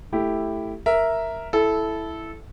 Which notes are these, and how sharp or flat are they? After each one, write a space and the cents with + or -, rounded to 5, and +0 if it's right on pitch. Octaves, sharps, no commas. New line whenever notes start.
A3 +0 E4 +0 G4 +0
A#4 +0 E5 +0
E4 +0 A4 -15